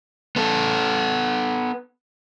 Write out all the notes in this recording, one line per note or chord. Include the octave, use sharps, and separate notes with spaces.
B3 A4